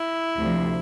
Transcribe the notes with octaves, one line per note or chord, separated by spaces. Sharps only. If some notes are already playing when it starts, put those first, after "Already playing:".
Already playing: E4
D2 C3 F3